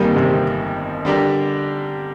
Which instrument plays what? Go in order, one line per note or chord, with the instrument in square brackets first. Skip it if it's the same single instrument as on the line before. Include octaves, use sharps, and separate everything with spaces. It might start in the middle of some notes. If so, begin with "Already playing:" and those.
Already playing: [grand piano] G1 F2 D#3 [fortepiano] G3 A#3
[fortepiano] C3
[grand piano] D3 G3 D4 G4 A#4